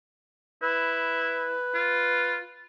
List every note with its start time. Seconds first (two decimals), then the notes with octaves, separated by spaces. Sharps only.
0.63 E4 B4
1.75 F4